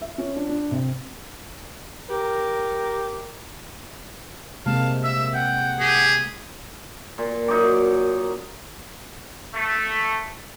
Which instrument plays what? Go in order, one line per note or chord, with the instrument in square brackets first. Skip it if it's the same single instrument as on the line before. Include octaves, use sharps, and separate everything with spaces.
[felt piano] E5
C#4
D4
D4
C3
[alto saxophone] G4 [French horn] A#4
[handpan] C3 G#3 A#3 [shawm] F5 [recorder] A5
[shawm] E5 [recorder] E6
[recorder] F#5 [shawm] G5
[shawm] G4 [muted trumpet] G#4
[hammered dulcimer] A#2
F#2 D#4 C#6 D6
[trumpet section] A3